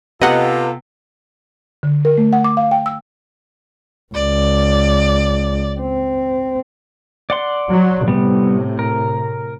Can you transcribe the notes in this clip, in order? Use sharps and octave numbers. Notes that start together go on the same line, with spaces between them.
C3 B3 F4 A4 D#5 F#5
D3
A#4
A3
F#5
D6
F5
G5
E6
C#2 D5
C4
D5 F#5 C6
F#3
A2 C3 G3 B3
A#4